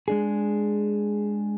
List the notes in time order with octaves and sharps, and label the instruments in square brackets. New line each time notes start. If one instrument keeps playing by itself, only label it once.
[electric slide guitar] G#3 D4 G#4